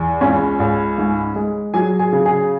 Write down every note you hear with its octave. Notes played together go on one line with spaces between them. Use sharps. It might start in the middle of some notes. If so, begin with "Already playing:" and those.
Already playing: E2
C#2 C#4 C#5
C#2
G#2
G#3
F#3 G#4 G#5
G#4 G#5
C#3
G#4 G#5